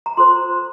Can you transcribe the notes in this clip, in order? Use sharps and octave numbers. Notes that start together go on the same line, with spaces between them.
A#5
F4 A4 C5 C6